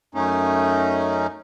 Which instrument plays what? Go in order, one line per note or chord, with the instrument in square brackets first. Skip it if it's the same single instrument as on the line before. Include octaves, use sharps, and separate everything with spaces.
[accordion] F#2 A3 C#4 D#4